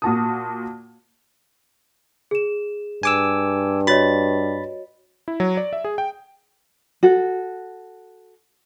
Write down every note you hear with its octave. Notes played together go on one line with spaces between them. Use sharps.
A#2 F#4 A5 D#6
G#4 E7
G2 G#5 D6 E6
F#4 C#5 D#5 B5 A6
E4
F#3
D5
E5
G#4
G5
F#4 A4